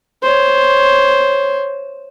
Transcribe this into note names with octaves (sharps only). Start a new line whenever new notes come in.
C5 C#5